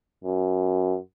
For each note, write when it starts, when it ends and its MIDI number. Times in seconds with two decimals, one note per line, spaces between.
0.24 0.96 42